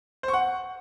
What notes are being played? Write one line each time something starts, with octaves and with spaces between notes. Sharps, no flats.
C5
C#6
F#5